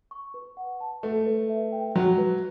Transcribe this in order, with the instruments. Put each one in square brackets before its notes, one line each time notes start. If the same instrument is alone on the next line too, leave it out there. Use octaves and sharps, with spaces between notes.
[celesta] C#6
B4
F#5
A5
[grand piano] A3 [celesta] B4
[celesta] B4
E5
G5
[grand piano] F#3 [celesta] B4
[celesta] B4